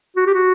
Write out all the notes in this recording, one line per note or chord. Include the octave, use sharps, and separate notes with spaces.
F#4
G4
F#4